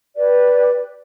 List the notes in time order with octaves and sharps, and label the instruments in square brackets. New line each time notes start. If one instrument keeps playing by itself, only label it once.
[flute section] G4 B4 D5